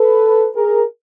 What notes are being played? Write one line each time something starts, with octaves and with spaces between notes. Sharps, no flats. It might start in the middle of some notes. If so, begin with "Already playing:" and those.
Already playing: A4 B4
G#4 A#4